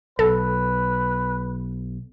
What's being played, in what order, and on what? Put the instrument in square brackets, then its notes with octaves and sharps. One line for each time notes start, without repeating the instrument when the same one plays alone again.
[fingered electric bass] B1 [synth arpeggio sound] A4 [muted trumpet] B4